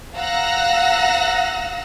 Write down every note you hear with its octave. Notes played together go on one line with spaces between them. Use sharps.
F5 F#5 A#5 E6 F#6 A#6